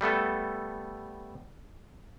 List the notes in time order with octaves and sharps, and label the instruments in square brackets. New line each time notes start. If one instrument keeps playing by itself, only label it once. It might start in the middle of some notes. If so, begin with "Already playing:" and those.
[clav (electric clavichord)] G3 A3 B3 A4